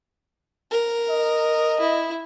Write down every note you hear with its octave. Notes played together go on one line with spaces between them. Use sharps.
A#4
D#5
E4